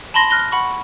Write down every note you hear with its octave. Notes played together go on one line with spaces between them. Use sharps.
A5 B5 C6 A#6
F6 F#6 A#6 G7
F#5 B5 C#6